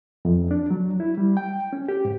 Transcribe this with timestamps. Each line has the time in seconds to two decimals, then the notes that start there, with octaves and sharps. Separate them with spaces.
0.25 F2
0.51 D4
0.70 F#3
1.00 E4
1.18 G3
1.37 G5
1.73 C#4
1.89 G4
2.05 G#2